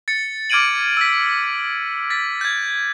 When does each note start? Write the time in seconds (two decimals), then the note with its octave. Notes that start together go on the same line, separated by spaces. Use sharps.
0.08 A6 C#7
0.50 D6 F6 G#6 D7 D#7 F#7
0.97 E6 B6
2.10 A6 B6
2.41 G6 G#6